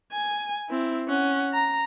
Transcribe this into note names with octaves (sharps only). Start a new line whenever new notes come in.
G#5
C4 E4
C#4 F#5
A#5